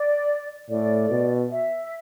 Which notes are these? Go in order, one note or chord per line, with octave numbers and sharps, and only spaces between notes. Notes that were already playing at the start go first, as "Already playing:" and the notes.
Already playing: D5
A2 D5
B2
E5